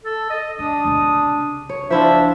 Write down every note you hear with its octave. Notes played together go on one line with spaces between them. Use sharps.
A4
D#5
D4 D#4 D#6
C2 C#3
C#5
F3 D4 E4 F4 E5